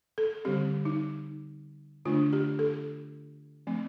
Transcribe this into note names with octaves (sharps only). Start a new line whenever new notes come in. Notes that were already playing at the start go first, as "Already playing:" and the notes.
A4
D3 G3 C4 G4
D#4
D3 A3 D4 F4
G4
A4
F3 A3 C4